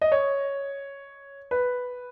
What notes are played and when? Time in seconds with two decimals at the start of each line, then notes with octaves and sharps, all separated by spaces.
0.02 D#5
0.12 C#5
1.51 B4